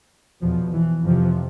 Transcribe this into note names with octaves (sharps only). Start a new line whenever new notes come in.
E2 B2 F3
E3
F2 C3 F3